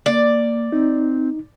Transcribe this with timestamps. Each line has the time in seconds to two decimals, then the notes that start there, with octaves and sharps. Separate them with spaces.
0.06 A#3 D5
0.72 C4 D#4